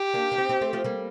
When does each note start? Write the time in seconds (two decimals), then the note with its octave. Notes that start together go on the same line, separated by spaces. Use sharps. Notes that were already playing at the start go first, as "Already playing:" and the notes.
Already playing: G4
0.14 A#3 D4
0.32 D4
0.38 C4 D#4
0.49 C4 D#4
0.61 A3 C4
0.73 F3 A3
0.84 G3 A#3